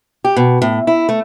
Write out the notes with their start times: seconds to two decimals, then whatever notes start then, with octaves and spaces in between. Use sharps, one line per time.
0.24 G4
0.36 B2
0.62 A2
0.87 E4
1.09 A3